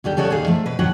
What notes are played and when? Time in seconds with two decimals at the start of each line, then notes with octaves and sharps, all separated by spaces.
0.04 D#2 D3 G3 G5
0.17 C#3 G3 A4 C#5 D#5 F#5
0.30 D#2 A#2 D#3 G#4 F5
0.47 F3 A3
0.66 B2 B4
0.79 D#2 B2 F#3 G4 F#5